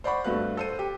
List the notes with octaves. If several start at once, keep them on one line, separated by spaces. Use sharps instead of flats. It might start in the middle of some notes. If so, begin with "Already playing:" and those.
C5 D5 F#5 B5 C#6
G2 A3 F#4 B4 F5 F#6
A4 C5 D#7
G4